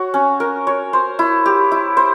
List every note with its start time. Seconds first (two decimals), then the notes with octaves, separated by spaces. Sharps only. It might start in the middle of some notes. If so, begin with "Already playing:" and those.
Already playing: F#4 C#5
0.14 C#4
0.40 A#4
0.67 C#5
0.93 C5
1.19 E4
1.46 G4
1.72 E4
1.97 C5